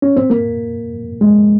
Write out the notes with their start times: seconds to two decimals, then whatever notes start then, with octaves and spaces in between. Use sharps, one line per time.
0.02 C#4
0.17 C4
0.30 A#3
1.21 G#3